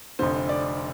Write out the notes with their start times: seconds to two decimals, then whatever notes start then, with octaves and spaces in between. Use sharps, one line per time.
0.19 F1 F2 D3 C5
0.49 D5